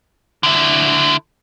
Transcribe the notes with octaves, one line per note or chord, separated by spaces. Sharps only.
D3 E4